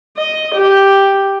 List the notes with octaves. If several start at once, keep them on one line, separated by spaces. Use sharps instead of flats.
D#5
G4